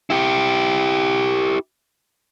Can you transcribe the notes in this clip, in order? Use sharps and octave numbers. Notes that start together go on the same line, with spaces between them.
E4 G4